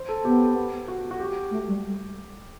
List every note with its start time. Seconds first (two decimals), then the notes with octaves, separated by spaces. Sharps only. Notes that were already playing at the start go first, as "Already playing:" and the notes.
Already playing: C5
0.09 A4
0.24 B3 G4
0.88 F#4
1.11 F#4
1.20 G4
1.51 A3
1.68 G3